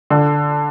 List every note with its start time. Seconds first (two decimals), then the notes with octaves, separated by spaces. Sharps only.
0.10 D3